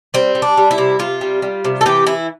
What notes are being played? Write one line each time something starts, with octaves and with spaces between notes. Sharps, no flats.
G3 C4
G3
D4
G3
E4
C3
C3 F4
G3
G3
C3
A4
E3 G4
E3 E4